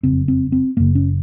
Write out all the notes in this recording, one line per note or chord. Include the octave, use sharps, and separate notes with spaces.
F#1 F2 C#3 C4
C4
C4
F#1 F#2 C#3 A#3
C#4